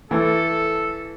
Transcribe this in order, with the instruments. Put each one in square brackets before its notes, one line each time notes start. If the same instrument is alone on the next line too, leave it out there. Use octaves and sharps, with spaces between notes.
[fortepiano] E3 A3 [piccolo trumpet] A4